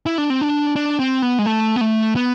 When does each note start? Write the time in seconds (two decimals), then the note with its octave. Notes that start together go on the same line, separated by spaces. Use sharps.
0.06 E4
0.18 D4
0.30 C4
0.41 D4
0.76 D4
1.00 C4
1.22 B3
1.39 G#3
1.46 A3
1.76 B3
1.81 A3
2.16 B3